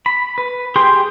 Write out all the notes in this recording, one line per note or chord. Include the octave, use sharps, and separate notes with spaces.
B5
B4
G4 G#4 G5 C6